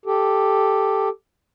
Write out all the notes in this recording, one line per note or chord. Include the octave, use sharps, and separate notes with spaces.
G4 A4